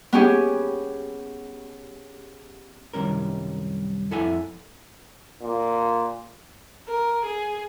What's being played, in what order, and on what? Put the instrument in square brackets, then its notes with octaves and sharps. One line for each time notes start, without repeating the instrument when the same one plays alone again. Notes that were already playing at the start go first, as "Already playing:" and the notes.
[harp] B3 C#4 G4 G#4
[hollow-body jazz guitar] C2 F#2 D#3 G3 C#4 A#4
F2 E4 A4 E5 F#5 G#5
[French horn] A#2
[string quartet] A#4
G#4